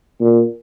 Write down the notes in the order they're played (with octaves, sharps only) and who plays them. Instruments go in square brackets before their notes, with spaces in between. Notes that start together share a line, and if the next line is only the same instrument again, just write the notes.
[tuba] A#2